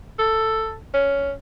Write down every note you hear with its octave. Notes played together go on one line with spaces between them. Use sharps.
A4
C#4